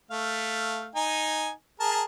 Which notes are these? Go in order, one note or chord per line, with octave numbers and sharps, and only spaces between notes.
A3 F5
D#4 G#5
G#4 A#4 A5